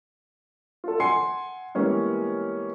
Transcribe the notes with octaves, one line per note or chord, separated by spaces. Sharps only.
F4 F#4 A4
F#5 G#5 C6 G#6 C7 C#7
E3 G3 G#3 A#3 B3 C#4